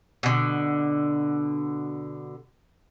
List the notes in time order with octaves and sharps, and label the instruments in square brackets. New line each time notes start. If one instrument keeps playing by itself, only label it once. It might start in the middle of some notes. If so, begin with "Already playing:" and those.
[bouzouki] B2 D3